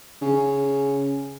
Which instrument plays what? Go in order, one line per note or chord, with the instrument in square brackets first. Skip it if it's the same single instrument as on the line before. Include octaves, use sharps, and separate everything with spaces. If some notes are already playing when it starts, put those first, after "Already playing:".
[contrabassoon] C#3